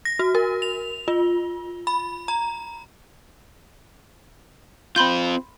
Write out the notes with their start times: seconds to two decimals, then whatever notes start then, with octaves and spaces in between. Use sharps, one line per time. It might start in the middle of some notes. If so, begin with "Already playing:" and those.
0.05 A#6
0.19 F#4
0.35 A#4
0.62 F7
1.08 F4
1.87 B5
2.28 A#5
4.96 C4 F4 B5 C6 G6